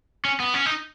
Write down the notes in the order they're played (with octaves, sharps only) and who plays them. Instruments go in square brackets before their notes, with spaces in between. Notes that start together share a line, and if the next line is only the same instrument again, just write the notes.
[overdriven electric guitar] C#4
B3
C#4
D#4